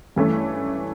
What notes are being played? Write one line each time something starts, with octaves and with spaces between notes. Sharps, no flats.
G2 E3 A3 C#4